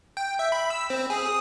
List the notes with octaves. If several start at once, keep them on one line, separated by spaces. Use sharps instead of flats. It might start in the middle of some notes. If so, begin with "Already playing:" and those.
G5
E5
B5
E6
C4
G#4
D#6